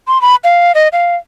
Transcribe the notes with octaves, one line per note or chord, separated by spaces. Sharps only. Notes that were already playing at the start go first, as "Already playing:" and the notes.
C6
B5
F5
D#5
F5